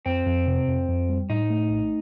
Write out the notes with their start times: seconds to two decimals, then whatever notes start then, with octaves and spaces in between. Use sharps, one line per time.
0.06 F2 C4
0.27 F2
0.47 C3
0.68 F2
0.89 F2
1.09 G3
1.30 A2 D#4
1.50 A3
1.70 A#1